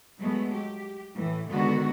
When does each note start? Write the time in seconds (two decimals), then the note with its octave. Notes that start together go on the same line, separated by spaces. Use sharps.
0.19 F#3 G#3 A3 B3
0.53 G4
1.15 A2 E3
1.50 D3 D#3 G#3 B3 F#4